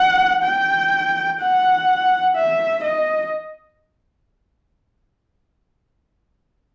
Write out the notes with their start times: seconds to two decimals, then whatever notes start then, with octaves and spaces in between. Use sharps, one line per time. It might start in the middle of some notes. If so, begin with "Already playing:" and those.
Already playing: F#5
0.44 G5
1.40 F#5
2.36 E5
2.84 D#5